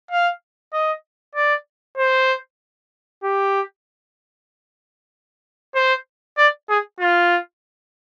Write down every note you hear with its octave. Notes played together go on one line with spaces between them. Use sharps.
F5
D#5
D5
C5
G4
C5
D5
G#4
F4